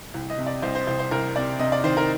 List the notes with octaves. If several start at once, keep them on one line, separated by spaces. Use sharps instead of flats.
C2
D#5
C3
D5
C2 C5
C5
C2 C5
C5
C2 A#4
C3 D5
C3 D#5
D5
D#3 C5
A#4